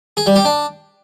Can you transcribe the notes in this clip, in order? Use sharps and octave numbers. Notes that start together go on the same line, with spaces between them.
G#4
G3
G4
D4